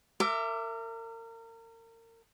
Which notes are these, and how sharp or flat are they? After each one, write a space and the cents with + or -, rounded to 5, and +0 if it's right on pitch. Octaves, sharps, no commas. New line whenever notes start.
A#4 -35 E5 +20 D6 +0